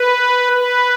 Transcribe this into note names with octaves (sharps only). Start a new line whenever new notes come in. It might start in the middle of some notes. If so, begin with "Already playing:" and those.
Already playing: B4
B4